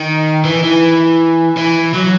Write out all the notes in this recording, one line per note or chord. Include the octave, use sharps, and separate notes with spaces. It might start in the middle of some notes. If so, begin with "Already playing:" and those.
Already playing: D#3
E3
E3
E3
F#3